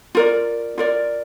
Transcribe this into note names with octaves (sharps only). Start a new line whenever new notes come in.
F4 A#4 D5
F4 A#4 D5